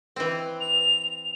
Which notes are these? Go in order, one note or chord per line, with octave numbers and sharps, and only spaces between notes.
E3 C4
F7